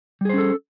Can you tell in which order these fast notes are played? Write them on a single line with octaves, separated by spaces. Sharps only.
G3 G#4 C5 C#4 A4